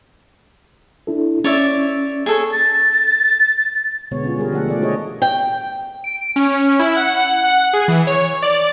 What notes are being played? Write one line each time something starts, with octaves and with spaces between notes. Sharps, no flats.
D4 E4 A4
C#4 C#5 D5 E5
G#4 A4 C#5
A6
B2 D3 G#3 B3 C#5
C#4 F4
G3 G#4 A#4
D3 F3 A3 A4 F#5
D#3 F3 A3 D5
A3 D4 F#4 G#4 C#5 D#5
G5
D7
C#4
E4
F#5
F#5
G#4
E3
C#5
D5